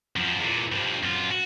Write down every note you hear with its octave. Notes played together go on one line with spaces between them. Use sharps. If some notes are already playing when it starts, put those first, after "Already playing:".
F#2 F3
E2 A#2
G2 F3
F#2 F4
F#4